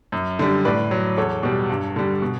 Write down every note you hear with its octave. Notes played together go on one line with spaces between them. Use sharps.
F#2
D3 G3
A2 B4 D5
F#3
E2 A4 C#5
B2 G3
G2
D3 G3
B2